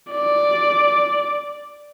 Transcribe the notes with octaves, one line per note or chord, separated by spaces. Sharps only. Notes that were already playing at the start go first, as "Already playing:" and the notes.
D5